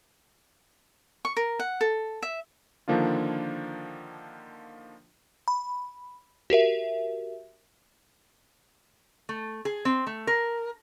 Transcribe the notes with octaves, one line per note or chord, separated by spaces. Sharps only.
C#6
A#4
F#5
A4
E5
D3 D#3 F3 A#3 D4 F4
B5
F#4 G4 A#4 E5
A3
G#4
C4
A3
A#4